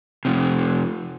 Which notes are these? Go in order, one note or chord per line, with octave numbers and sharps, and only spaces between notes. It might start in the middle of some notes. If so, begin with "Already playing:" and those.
F2 C3